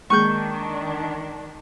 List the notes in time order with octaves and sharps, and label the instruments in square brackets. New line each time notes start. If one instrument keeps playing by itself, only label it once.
[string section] D#3 D4 [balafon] G#3 A#3 G#4 [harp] C#6 G6